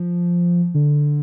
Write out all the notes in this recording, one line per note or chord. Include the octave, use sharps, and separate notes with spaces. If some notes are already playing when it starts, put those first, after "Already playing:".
Already playing: F3
D3